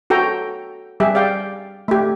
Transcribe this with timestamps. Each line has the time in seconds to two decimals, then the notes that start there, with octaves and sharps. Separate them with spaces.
0.10 F#4 A4 G5 A#5
1.00 G3 G4 G#4 E5
1.15 D5 F5 G5
1.88 A3 G4